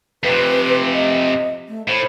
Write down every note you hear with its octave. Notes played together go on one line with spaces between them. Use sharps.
F2 C3 B4
D#5
A3
A2 C5